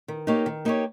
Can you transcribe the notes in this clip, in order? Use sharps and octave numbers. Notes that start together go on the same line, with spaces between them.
D#3
A#3 D#4 G4 C#5
D#3
A#3 D#4 G4 C#5